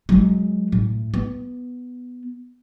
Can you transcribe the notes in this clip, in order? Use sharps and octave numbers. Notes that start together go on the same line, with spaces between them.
F#3 G#3
A2
B3